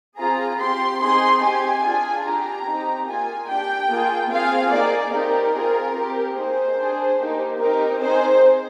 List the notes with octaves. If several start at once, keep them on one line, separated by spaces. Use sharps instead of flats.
C4 F4 G#4 A#5
C4 G4 C6
C4 D#4 G#4 C6
C4 G4 G#5
D4 F4 G#4
D4 G4 A#5
C4 D#4 G4
A#3 F4 G#4 G#5
D4 G4 G5
A#3 F4 G#4
C4 F4 G#4 F5
A#3 D#4 G#4 D5
C4 D#4 G4 A#4
C4 F4 G#4
C4 G4
A#3 D#4 G#4 C5
D4 G#4
A#3 D#4 G4
C4 D#4 G4 A#4
C4 D#4 G#4 C5